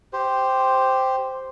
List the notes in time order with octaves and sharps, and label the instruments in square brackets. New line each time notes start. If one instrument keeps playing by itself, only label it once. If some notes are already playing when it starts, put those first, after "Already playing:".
[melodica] G4 C5